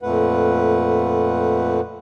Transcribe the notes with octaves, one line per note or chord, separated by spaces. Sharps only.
F2 A#2 A3 B4 F#5